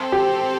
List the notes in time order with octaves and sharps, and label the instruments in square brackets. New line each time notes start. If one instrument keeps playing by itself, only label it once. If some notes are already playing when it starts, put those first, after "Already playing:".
Already playing: [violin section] C4 A4 C5
[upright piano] G4